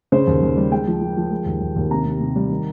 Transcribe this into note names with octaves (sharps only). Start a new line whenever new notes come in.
C#3 C5
D#2
D#2
G3
G#3 G5
F3
F3
F3
G#3
D#2
D#2
D#2
C3 A#5
C3
C3
G3
D#3